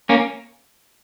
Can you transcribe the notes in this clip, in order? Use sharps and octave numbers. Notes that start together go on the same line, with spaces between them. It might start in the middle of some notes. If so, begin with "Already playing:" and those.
A#3 C#4